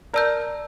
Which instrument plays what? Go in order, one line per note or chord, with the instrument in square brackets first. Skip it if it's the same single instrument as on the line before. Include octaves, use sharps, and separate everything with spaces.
[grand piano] A#4 [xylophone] D5 A5 E6 G6